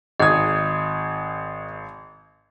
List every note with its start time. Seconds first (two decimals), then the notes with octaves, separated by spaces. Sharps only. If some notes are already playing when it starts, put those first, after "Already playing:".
0.20 G#1 D#5 D#6 G#6